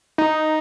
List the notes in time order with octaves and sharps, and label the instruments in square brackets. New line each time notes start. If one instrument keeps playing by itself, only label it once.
[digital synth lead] D#4